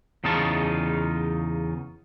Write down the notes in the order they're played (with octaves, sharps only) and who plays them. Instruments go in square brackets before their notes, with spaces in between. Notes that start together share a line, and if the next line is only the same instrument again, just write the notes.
[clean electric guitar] E2 C#3 D#4 F4 A5